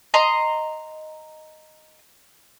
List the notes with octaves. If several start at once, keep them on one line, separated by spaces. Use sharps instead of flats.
D#5 A#5 C6